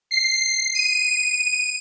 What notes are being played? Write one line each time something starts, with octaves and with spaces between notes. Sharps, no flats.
C7
D#7